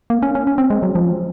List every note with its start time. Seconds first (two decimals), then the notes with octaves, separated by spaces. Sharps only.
0.10 A#3
0.23 C#4
0.35 C#4
0.47 C#4
0.58 C4
0.70 G#3
0.83 F#3
0.95 F3